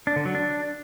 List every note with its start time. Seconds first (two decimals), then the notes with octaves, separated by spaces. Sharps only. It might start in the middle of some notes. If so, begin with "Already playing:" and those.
0.07 D4
0.16 D3
0.25 F#3
0.35 D4